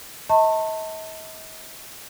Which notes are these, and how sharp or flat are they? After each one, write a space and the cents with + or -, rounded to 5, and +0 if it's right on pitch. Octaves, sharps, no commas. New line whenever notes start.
D#5 +45 A5 +30 C#6 -40